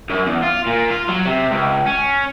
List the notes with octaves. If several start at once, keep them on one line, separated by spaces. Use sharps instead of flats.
F#2
E2
F4
A#2
F4
F#3
C3
C#2
C#4